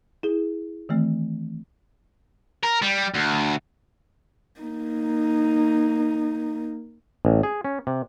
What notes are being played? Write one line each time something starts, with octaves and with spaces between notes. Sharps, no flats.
E4 G#4
D#3 E3 A3 C4
A#4
G3
D2
A#3 D#4
A1
G#4
C#4
C3